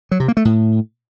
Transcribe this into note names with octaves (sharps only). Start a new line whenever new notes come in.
F#3
C3
A#3
A3
A2